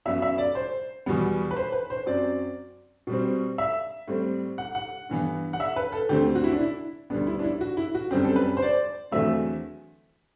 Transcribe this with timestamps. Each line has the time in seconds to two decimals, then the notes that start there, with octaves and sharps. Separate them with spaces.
0.05 F#2 F#3 B3 E5
0.22 E5
0.38 D5
0.55 C5
1.06 E2 B2 G3 B3
1.51 B4
1.56 C5
1.72 B4
1.90 C5
2.06 F#2 F#3 C4 D5
3.07 B2 G3 C4
3.58 E5
4.08 A2 G3 C4
4.58 F#5
4.75 F#5
5.09 G2 E3 B3
5.53 F#5
5.60 E5
5.76 B4
5.92 A4
6.09 D2 D3 A3 C4 G4
6.35 F#4
6.44 E4
6.52 D4
6.61 E4
7.10 D2 D3 G3 B3 D4
7.27 E4
7.39 D4
7.44 E4
7.61 F#4
7.77 E4
7.94 F#4
8.11 F#2 D3 G3 C4 G4
8.24 A4
8.36 B4
8.57 C5
8.62 D5
9.11 E2 D3 F#3 A3 C4 E5